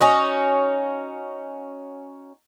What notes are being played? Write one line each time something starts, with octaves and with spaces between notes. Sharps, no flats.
C#4 D#4 F#4